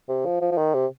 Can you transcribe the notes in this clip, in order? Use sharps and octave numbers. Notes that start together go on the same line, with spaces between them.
C3
F3
F3
F3
D#3
C3